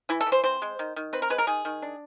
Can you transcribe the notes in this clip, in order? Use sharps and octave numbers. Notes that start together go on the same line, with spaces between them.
E3 E4
A4
E3
C5
C4 C5
G#3
D#3
D#3
C4 B4
A#4
G#3 B4
A#4
D#3 G#4
D#3
D4